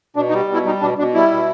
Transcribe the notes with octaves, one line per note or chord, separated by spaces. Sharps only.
B2 D4
D#4
G3
B2 E4
G3 D#4
B2 D4
B2 D4
G3 E4
B2